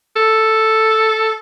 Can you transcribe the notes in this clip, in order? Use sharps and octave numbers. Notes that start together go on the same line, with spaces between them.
A4